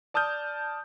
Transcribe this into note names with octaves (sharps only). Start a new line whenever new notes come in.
D5 A5 D#6 F6 G6